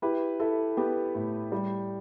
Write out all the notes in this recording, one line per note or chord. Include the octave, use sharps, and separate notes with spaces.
E4 G4 B4
E4 A4
B3 G4 B4
A2
G3